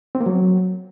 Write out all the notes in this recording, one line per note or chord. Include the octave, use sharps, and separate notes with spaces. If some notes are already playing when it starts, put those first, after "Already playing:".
C4
A#3
F#3